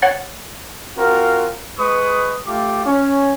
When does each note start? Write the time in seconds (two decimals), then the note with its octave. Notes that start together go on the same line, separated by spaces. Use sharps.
0.02 C#5 F#5 A6
0.98 C4 F4 F#4 A#4
1.79 G#3 B4 C#6 D#6
2.47 A3 F4 G4 D6
2.86 C#4